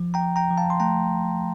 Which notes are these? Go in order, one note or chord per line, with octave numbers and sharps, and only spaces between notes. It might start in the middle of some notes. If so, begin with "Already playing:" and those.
Already playing: F3
G5 A#5
F3
G5 A#5
F3
F5 A5
C6
A3 G5 A#5